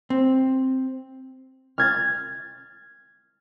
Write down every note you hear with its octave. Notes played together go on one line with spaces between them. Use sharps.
C4
F6 G#6 A6